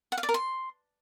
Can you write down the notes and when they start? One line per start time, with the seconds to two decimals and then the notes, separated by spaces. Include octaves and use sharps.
0.12 F#5
0.18 F5
0.23 D5
0.29 A#4
0.34 C6